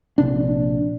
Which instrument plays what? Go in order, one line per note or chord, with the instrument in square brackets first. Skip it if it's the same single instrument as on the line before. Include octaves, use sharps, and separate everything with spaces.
[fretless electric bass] A#1 C3 D4